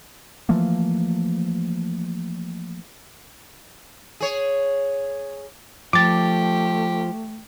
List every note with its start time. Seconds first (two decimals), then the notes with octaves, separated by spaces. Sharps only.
0.49 E3 F3 A3 A#3
4.20 G#4 C#5
5.93 F3 A3 G4 D6 A6